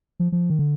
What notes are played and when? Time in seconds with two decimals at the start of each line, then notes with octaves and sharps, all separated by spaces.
0.20 F3
0.32 F3
0.50 D#3
0.59 D3